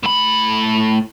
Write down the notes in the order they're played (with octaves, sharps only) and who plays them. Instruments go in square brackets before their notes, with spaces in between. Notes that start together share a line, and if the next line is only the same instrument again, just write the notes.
[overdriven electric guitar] A2 B5